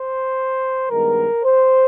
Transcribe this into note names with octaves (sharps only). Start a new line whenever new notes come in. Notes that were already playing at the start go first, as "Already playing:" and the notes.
Already playing: C5
G2 D#3 G#3 B3 A#4
C5